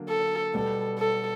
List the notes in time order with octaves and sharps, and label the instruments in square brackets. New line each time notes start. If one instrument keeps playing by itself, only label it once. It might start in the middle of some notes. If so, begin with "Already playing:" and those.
Already playing: [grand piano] D3 F#3 A#3
[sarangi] A4
[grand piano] B2 G3 B3 [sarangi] A4
[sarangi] A4